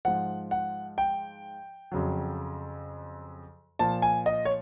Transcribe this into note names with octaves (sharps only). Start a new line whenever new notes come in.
G#2 F3 F#5
F#5
G5
F2 C#3 F#3
A#2 F3 A5
G#5
D#5
C#5